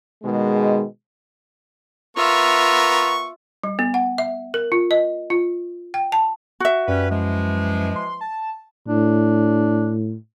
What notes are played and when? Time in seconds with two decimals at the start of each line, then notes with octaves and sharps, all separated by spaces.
0.23 B2 D#3 G#3
2.17 B3 F4 A#4 E5 C#6
3.64 G3
3.79 B3
3.94 F#5
4.18 E5
4.54 A#4
4.72 F4
4.91 D#5
5.30 F4
5.94 G5
6.12 A5
6.60 F#4 E5
6.88 F#2 G3 C#4 B4
7.10 E3 F3 G#3
7.96 C6
8.21 A5
8.88 A2 D4